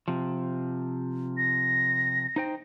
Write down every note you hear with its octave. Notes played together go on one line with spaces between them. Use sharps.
C3 F3
A#6
D#4 C5 G5